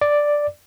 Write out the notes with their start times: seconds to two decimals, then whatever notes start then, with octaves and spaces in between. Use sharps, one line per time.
0.01 D5